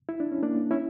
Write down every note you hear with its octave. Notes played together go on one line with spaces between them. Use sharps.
E4
D4
C#4
A#3 D4
C#4 E4